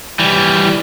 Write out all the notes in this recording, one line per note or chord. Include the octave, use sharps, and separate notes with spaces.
E3 G3